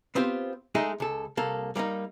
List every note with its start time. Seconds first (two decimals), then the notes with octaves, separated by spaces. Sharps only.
0.15 B3 C4 F4 G4 C5
0.75 G#3 A3 D#4 G#4
1.00 C#2 A4
1.37 C2 A#3 A4
1.76 G3 A#3 C#4 D#4